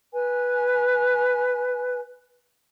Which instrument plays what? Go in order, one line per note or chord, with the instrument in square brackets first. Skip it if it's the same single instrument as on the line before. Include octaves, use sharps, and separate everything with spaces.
[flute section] B4 G#5